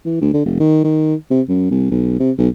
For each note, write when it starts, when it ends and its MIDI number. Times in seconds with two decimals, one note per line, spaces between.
0.05 0.18 52
0.21 0.33 38
0.33 0.41 50
0.45 0.57 29
0.59 0.81 51
0.84 1.15 51
1.30 1.41 48
1.48 1.68 42
1.71 1.87 36
1.91 2.16 35
2.20 2.31 48
2.38 2.48 35